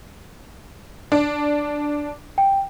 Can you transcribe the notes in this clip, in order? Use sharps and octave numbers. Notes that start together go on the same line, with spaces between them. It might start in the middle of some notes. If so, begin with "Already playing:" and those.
D4
G5